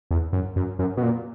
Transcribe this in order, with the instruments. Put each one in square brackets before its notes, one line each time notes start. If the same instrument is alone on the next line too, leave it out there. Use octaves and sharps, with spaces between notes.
[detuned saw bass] E2
F#2
F#2
F#2
B2
A#2